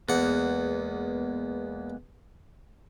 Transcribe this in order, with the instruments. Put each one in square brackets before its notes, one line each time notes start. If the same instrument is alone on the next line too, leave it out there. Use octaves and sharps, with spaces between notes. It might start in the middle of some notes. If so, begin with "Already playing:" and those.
[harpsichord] E2 F#5 [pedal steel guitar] G#3 A#3 B3